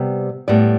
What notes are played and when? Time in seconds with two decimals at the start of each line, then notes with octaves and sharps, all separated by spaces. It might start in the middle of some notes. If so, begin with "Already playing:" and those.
Already playing: C3 G3 B3
0.48 A2 G3 B3 D5